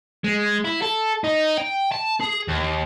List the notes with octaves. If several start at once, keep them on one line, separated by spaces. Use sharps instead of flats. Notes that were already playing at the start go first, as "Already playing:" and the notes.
G#3
E4
A4
D#4
G5
A5
G#4
D#2